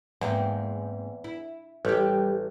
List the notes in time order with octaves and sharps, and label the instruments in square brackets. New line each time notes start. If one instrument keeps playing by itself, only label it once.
[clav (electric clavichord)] E2 [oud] G#2 A#3 C4
[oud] E4
[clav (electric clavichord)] A1 [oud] G3 G4